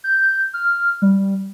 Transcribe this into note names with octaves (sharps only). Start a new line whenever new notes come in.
G6
F6
G3